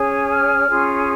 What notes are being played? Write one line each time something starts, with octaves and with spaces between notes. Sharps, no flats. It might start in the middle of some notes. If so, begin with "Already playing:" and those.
Already playing: C#4 G#4 C#5
F6
C#4 F4 G#4